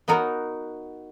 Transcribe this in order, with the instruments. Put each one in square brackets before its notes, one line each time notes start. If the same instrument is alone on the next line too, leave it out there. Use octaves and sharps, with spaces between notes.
[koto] B3 D#4 F#4 A#4